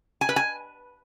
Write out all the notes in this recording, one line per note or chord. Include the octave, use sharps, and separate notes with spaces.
G#5
B4
G#5